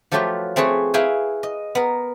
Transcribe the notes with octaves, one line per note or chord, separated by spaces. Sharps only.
F3 F#3 A3 F4 G4 B4
A3 C4 G#4 B4 C#5
E4 G#4 B4 F5 G5 G#5
D#5
B3 A#4